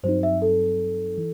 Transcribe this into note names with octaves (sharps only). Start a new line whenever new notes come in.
G2 F#3 C4 D#4 C5
E5
A4
E3